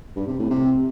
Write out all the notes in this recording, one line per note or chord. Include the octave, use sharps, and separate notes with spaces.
G2
C3
A2
C3